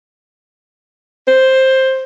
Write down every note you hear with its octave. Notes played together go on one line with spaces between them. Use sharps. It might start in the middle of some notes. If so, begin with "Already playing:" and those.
C5